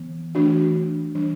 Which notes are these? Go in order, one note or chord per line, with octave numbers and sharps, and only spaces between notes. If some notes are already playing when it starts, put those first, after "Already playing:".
Already playing: E3 B3
E3 A3 D4 F#4
E3 G3 D4